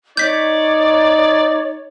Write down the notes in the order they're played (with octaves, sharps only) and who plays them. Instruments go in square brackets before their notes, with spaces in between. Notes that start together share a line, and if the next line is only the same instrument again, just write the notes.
[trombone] D#4 [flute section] C#5 [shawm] D5 [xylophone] G6 B6